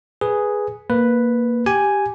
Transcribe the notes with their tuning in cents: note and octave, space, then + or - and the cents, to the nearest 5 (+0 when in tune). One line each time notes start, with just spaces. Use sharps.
G#4 +0 B4 +0
A#3 +0 B4 +0
G4 +0 G#5 +0